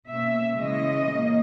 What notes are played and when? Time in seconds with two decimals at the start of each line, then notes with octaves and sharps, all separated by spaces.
0.09 B2 A#3 C#4 E5
0.59 C#3 E3 G#3 C#4 D#5
1.10 A#2 A#3 C#4